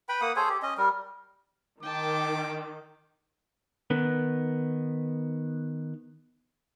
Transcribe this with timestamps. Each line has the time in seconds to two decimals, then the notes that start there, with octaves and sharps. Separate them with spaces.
0.09 B4 G5 B5
0.21 A#3 F#5 D#6
0.36 G#4 A4 C5 C#5
0.49 G4
0.62 C#4 D#5
0.78 G3 A#4
1.83 D#3 G5 A5 D6
3.90 D#3 B3